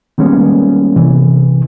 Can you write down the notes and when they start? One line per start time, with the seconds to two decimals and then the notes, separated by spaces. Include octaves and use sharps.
0.18 D#3 G3 G#3 A#3 B3 C#4
0.96 C3 E3